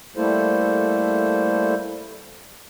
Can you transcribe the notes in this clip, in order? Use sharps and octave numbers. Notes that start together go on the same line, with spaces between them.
G3 A3 A#3 E4 A4 C5